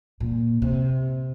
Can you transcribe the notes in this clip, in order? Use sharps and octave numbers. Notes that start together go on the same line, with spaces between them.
A#2
C3